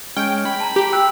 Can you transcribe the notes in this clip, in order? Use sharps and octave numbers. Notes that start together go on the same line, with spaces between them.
G#3 C#4 G5 F6
B5
A5 A#5
G4
G5 E6 F#6